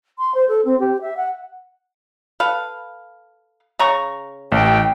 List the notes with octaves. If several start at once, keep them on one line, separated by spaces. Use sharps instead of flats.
C6
C5
A4
C4
G4
E5
F#5
A4 B4 F5
C#3 A#5 C#6
A1 G5